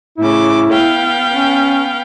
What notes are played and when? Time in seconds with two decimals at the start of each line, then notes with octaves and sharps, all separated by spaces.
0.18 A2 C#3 E4 D6
0.71 B3 F5 G5
1.33 C#4